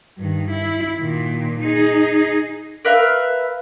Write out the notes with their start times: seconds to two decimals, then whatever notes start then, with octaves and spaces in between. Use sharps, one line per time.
0.18 G2 D#3
0.50 E4
0.98 A#2 D#3
1.60 D#4 G#4
2.85 A#4 B4 E5 F5